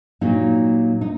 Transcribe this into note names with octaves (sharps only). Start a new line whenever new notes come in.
A#2 F#3 A#3 D#4
D#4